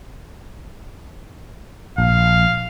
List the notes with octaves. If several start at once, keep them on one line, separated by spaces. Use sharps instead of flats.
A#1 F5